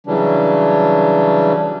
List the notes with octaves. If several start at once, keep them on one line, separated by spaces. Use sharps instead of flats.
C#3 E3 F#3 G3 D4